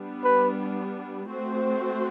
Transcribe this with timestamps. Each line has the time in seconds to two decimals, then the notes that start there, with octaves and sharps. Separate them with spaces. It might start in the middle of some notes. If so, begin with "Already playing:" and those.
Already playing: G3 B3 D4
0.24 B4
1.28 A3 C4 F#4 C5